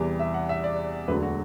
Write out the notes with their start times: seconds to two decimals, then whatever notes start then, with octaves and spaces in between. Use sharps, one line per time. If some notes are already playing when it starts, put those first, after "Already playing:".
Already playing: E2 C3 E3 G3
0.19 E5
0.34 F#5
0.49 E5
0.64 D5
1.08 E1 D2 D3 F#3 B4
1.23 F#4